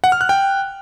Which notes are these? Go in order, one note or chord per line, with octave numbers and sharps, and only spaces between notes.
F#5
F6
F#6
G5